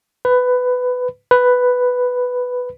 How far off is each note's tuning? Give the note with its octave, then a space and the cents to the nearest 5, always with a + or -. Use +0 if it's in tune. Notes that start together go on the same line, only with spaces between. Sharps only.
B4 +15
B4 +5